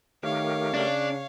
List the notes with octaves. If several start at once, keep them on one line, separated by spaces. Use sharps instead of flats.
D#3 A3 G4 A#4 C#5 F5
C#3 D4